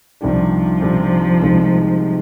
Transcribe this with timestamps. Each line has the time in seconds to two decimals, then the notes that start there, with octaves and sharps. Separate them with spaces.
0.21 C2 C3 D#3 F3 G3 D4
0.82 C2 C3 D#3 G3 D4
1.41 C2 C3 D#3 G#3 D#4